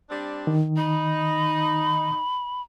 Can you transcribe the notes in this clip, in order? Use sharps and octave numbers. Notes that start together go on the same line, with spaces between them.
G3 C4 D4
D#3
D#4 B5